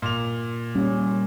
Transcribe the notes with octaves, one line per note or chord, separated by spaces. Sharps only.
A#2 F7
G3 A#3 C#4